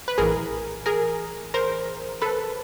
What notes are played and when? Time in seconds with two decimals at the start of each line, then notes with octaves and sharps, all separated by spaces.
0.08 B4
0.18 A#1 A2 E3 G#4 A#4
0.86 G#4 A#4
1.54 A#4 C5
2.22 A4 B4